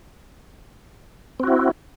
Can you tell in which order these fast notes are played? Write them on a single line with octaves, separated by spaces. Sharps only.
C4 F#4 E4